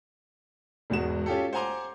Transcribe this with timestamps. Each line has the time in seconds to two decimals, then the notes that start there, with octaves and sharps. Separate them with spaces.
0.90 E1 E2 G#2 F#4 E7
1.26 C#4 F4 G4 A4
1.53 C5 F#5 G#5 A#5 C6 D6